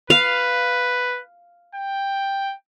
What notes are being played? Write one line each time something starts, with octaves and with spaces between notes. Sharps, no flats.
B4 F5
G5